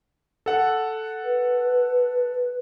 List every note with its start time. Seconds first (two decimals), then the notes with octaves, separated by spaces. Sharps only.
0.46 A4 F#5
1.24 B4